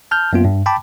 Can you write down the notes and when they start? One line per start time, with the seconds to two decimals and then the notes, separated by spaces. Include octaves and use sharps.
0.11 A5 F6 G6
0.33 F#2 A#3 B3 F4
0.45 G2
0.66 G5 A5 B5 D6